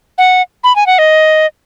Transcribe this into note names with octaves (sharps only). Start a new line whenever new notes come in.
F#5
B5
G#5
F#5
D#5